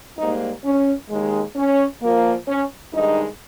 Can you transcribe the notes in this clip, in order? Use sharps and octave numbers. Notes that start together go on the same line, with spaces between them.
G#2 G3 A#3 D#4
C#4
D#2 D#3 G#3
C#4
A#2 F3 A#3
C#4
G2 D#3 G#3 D#4